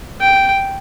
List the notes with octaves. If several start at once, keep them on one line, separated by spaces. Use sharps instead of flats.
G5